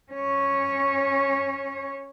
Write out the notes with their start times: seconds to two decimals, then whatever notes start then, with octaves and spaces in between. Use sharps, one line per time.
0.12 C#4 C#5